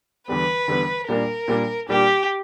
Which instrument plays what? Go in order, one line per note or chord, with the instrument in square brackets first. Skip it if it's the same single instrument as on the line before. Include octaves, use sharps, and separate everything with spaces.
[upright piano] E2 D3 G3 B3 [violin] B4
[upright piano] E2 D3 G3 B3
[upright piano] A#2 G3 A#3 D4 [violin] A#4
[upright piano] A#2 G3 A#3 D4
[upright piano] A#2 G3 A#3 D4 [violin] G4